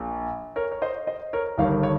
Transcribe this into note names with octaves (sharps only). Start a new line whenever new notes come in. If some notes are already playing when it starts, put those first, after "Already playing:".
Already playing: A#1 A#2
A#4 C#5
C#5
C5 D#5
C5 D#5
A#4 C#5
G1 G2 D#3 C#5 F5
C#5